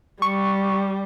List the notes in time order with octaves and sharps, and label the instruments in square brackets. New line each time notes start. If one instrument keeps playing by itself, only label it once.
[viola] G3 [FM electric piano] C#6